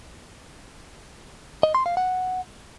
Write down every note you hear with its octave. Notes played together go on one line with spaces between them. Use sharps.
D#5
C6
F5
F#5